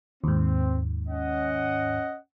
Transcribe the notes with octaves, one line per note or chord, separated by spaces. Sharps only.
D#2 G#2 C4
C#4 D#5 F#5